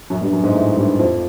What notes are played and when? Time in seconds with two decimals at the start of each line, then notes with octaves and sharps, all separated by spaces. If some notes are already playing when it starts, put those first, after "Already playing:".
0.10 F#2 F#3
0.21 G2 G3
0.32 F#2 F#3
0.43 G#2 G#3
0.54 A2 A3
0.76 G2 G3
0.99 F2 F3